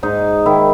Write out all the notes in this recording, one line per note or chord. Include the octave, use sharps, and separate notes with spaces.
G#2 D#4
D#3 E4